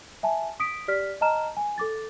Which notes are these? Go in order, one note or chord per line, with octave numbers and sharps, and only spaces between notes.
E5 G#5 A5
D#6 B6 D7
G4 D5 F6 B6
D#5 A5 A#5 F6 E7
G#5
A4 D6 A6